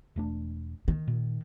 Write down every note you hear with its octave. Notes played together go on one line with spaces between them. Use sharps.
E1 A3 D4
D#3
A#2